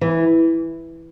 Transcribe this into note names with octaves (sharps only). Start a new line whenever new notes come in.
E3